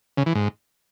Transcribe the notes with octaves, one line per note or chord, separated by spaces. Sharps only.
C#3
E3
G#2